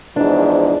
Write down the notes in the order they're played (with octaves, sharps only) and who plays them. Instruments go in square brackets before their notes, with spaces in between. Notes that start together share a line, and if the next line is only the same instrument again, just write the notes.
[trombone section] E2 G#2 F3 [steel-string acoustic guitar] D4